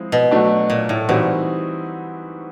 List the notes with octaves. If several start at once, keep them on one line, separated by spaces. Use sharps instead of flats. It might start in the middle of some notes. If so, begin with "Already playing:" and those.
Already playing: F3 G#3 C4 E4
B2
F#3 A3 D4
A#2
A2
A#2 E3 G3 C4 D#4 F#4